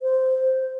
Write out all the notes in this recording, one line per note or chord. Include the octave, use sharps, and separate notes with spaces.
C5